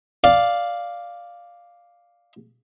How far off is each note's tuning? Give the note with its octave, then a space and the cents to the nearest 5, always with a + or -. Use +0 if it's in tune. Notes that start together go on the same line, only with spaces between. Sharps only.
D5 +0 F5 +0